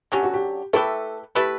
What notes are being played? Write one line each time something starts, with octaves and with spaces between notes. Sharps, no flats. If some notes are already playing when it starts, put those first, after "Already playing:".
D3 F#3 C#4 G4
F#4
G4
A3 E4 G4 A4 B4
A3 E4 G4 B4